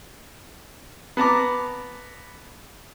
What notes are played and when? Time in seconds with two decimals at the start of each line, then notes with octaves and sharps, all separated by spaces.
1.17 B3 A5 A#5 D6